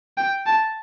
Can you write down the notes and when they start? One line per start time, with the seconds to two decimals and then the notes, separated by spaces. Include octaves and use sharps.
0.17 G5
0.46 A5